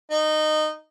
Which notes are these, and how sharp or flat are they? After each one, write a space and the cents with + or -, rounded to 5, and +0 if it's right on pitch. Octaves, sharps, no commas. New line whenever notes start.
D#4 -15